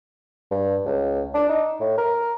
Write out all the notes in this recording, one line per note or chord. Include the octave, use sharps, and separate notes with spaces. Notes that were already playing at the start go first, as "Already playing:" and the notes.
G2
C#2
D4
D#4
A2
A#4